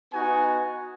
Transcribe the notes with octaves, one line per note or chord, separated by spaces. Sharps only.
B3 D#4 F#4 G#5